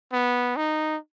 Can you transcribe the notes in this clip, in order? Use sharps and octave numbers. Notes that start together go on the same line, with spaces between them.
B3
D#4